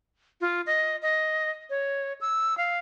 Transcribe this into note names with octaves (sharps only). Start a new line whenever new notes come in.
F4
D#5
D#5
C#5
E6
F5